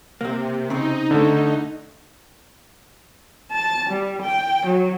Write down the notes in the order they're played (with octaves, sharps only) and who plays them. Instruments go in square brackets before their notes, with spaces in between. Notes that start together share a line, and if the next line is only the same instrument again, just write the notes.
[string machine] C3 [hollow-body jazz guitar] A#3 C4
[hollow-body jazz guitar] C#3 C4 [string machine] D#4
[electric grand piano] D3 A3
[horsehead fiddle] A5
G3
G5
F#3